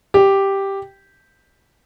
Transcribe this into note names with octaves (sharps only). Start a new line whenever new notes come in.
G4